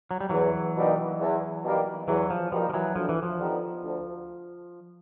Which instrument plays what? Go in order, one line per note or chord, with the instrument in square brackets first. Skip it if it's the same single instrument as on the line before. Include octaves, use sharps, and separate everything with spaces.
[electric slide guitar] F#3
G3
[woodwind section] E2 [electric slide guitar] E3 F#3
[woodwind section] B2 G3 A#3 D#4
E2
B2 G3 A#3 D#4
[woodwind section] E2 [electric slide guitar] E3 F#3
[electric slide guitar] F3
[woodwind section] B2 G3 A#3 D#4 [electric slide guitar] F3
[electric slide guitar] F3
E3 F#3
[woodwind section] D2 [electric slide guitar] F3
[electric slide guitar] E3
F3
[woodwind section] D3 G3 B3 D#4
D2